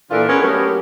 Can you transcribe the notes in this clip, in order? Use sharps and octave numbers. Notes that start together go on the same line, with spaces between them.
A#2 E3 D4 F4 A4 A#4
B3 C#4 G#4 A#4
F#3 A3 B3 C#4 G4 A#4